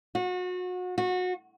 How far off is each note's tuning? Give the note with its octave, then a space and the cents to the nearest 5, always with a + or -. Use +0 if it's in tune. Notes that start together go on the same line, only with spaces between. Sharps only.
F#4 -30
F#4 -25